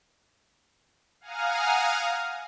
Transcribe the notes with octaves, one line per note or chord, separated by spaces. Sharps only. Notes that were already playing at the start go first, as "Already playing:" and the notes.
F5 F#5 G#5 A#5 D#6 F6